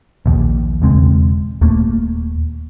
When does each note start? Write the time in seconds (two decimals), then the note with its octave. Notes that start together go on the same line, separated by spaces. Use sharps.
0.26 A#1 D#2
0.82 E1 C#3 G#3 C4
1.61 D#1 D#2 A3 A#3